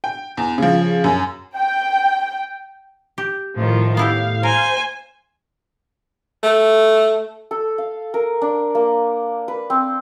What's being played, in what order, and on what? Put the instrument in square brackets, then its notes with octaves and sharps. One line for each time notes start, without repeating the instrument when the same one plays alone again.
[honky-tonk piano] G5
E2
C#3 F3
F#2
[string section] G5
[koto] G4
[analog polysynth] A2 [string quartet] D#3 F3
[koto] B3 E4 G4 [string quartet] F5
[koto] A#4 [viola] C5 G#5
[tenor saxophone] A3
[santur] A4
F5
A#4
D4
A#3
B4
C4